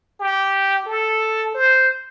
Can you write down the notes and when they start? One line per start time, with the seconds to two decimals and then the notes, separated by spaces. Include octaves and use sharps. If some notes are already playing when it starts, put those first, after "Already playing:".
0.20 G4
0.86 A4
1.54 C5